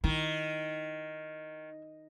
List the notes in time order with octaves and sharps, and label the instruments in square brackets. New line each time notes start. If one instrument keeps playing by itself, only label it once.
[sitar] D#3 [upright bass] E4